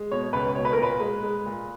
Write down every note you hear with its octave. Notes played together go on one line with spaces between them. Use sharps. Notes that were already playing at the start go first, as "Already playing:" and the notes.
Already playing: G#3
B2 C#5
C#2 B4
B2 C#5
B4
A#4
A#2 B4
G#3
G#3
A#2